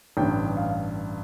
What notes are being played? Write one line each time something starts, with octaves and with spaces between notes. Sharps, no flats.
A1 G2 D3 G5
F5